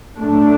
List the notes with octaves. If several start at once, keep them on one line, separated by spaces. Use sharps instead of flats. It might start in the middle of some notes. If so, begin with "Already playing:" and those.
A2 F#3 A3 D4